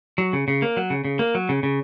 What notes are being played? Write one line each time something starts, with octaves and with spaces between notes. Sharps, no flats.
F#3
C#3
C#3
A#3
F#3
C#3
C#3
A#3
F#3
C#3
C#3